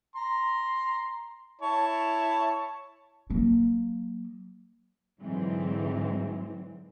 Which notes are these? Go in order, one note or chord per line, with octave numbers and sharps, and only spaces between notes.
A#5 C6
E4 C#5 A5
F#3 A#3
G#2 D3 E3 F#3 G#3 C4